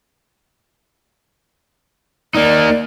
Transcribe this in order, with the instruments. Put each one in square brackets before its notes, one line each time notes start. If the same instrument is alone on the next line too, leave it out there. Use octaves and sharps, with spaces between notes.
[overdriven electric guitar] A#3 D#4 [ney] D5